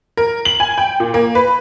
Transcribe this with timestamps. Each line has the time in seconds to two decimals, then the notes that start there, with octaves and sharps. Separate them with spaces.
0.17 A#4
0.45 F#7
0.60 G#5
0.78 G5
1.00 A#2
1.14 A#3
1.35 B4